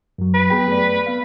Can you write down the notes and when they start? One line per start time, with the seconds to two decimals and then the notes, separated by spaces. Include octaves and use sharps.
0.18 F#2 F#3
0.34 B4
0.50 B3 G#4 G5
0.68 A3 D5
1.07 B3 F5